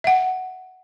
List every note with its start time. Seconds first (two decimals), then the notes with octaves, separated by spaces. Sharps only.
0.04 E5 F#5